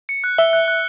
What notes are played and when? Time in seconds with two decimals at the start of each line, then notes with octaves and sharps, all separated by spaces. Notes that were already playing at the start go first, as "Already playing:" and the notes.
0.09 C#7
0.24 F#6
0.38 E5 G7
0.53 F#6
0.68 F#6